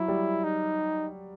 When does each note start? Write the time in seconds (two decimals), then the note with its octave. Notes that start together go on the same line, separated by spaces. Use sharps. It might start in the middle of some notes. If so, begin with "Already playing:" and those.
Already playing: F#3 E4
0.08 G3
0.44 D#4